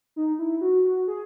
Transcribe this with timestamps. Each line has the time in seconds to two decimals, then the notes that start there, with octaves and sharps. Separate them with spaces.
0.16 D#4
0.39 E4
0.61 F#4
0.85 F#4
1.08 G#4